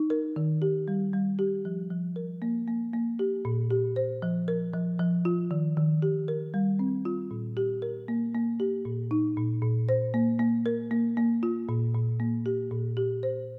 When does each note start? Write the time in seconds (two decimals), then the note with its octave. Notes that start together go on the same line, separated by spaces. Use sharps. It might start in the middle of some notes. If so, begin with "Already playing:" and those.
Already playing: D#4
0.10 A#4
0.36 D#3
0.62 G4
0.88 G3
1.13 G3
1.39 G4
1.65 F3
1.90 F3
2.16 A#4
2.42 A#3
2.68 A#3
2.93 A#3
3.19 G4
3.45 A#2
3.70 G4
3.96 C5
4.22 F3
4.48 A#4
4.73 F3
4.99 F3
5.25 F4
5.51 D#3
5.77 D#3
6.02 G4
6.28 A#4
6.54 G3
6.79 C4
7.05 F4
7.31 A#2
7.57 G4
7.82 A#4
8.08 A#3
8.34 A#3
8.60 G4
8.85 A#2
9.11 D#4
9.37 A#2
9.62 A#2
9.89 C5
10.14 A#3
10.39 A#3
10.66 A#4
10.91 A#3
11.17 A#3
11.43 F4
11.69 A#2
11.94 A#2
12.20 A#3
12.46 G4
12.72 A#2
12.97 G4
13.23 C5